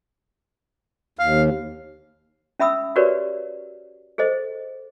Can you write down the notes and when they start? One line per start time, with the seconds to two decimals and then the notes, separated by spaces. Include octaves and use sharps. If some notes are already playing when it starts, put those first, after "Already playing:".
1.19 D#2 F5
2.59 C#4 E5 B5 D#6 E6
2.96 F#4 G4 A#4 B4 C#5 D5
4.18 G#4 A4 C5 D#5